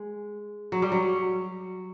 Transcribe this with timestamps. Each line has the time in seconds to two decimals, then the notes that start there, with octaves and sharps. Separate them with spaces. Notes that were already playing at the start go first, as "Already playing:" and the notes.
Already playing: G#3
0.72 F#3
0.82 G3
0.92 F#3